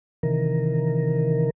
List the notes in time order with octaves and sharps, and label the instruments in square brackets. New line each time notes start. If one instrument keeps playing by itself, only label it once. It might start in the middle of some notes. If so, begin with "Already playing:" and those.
[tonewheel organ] C3 D#3 E3 A#4